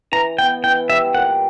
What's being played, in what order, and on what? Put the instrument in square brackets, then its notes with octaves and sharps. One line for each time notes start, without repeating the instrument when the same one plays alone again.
[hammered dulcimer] E3 [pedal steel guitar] A#5
[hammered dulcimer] B3 [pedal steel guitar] G5
[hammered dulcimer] E3 [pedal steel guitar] G5
[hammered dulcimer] G3 [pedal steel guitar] E5
[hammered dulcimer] A#2 [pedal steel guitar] F#5